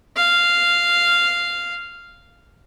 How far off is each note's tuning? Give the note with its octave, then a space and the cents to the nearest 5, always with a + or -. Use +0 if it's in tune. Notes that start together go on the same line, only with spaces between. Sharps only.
F5 -5